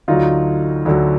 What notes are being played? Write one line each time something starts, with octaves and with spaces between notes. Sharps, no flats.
D2 D3 F#3 D#4 F4
D2 D3 F#3